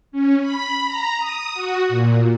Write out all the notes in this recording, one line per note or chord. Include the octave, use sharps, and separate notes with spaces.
C#4
B5
A#5
D#6
F#4
A#2